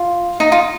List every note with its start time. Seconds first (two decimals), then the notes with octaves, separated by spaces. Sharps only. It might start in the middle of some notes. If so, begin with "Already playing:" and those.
Already playing: F4
0.40 D#4
0.52 F4